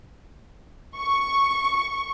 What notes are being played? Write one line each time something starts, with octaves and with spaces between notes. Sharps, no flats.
C#6